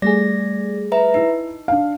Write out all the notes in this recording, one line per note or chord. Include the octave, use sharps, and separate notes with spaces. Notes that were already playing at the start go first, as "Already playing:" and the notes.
G3 A3 G#4 D5 A#6
B4 E5 A#5
D#4 E4
D4 F5